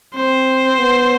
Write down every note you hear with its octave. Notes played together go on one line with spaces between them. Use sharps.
C4 C5
B3